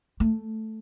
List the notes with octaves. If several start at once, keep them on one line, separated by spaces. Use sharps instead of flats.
A3